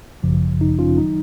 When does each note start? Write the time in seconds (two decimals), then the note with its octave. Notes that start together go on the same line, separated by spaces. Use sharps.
0.23 G#1 F#2 C#3 F3
0.61 D#4
0.79 C#4 F4
0.97 D#3 F#3 D#4